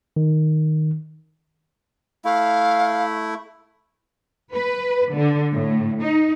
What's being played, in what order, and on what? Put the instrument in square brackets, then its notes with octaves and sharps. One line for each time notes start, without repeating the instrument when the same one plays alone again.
[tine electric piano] D#3
[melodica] A3 E4 [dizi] F5
[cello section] B4
D3
A2
D#4